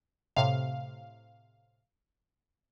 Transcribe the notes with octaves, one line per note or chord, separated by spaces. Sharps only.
A2 C3 F5